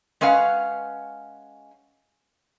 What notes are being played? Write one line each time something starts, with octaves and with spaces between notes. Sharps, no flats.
G#3 C#4 B4 F5 F#5